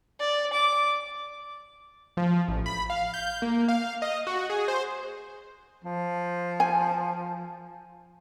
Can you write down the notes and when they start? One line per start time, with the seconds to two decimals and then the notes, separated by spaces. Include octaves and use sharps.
0.20 D5
0.53 D6
2.17 F3
2.48 A1
2.66 B5
2.90 F5
3.14 G6
3.42 A#3
3.68 F5
4.02 D#5
4.27 F#4
4.50 G#4
4.68 C5
5.84 F3
6.60 G#5